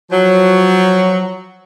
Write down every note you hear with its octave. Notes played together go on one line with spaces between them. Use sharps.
F3 F#3